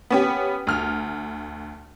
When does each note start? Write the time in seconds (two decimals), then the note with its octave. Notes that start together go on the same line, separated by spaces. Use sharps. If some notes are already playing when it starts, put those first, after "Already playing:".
0.10 B3 C#4 G4
0.67 D2 F6